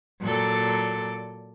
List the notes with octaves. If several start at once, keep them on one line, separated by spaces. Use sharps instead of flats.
A#2 F#3 A4 D5